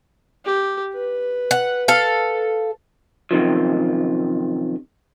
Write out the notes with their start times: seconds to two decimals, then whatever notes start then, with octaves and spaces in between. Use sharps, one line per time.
0.45 G4
0.94 B4
1.51 F#5
1.88 A4 F5
3.31 F#2 C3 D#3 F3